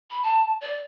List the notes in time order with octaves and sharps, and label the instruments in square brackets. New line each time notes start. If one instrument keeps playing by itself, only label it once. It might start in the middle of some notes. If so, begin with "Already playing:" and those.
[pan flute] B5
A5
D5